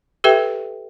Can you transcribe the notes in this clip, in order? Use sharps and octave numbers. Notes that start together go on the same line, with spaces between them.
G4 A4 B4 E5 G5